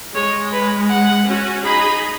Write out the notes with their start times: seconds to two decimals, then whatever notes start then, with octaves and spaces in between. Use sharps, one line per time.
0.15 G#3 C#5
0.53 B4
0.90 F#5
1.28 C#4 F#4
1.65 D#4 G#4 B5